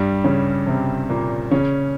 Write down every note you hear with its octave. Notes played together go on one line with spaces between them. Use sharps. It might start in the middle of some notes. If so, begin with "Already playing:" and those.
Already playing: G2 G3
C#3 C#4
C3 C4
A#2 A#3
C#3 C#4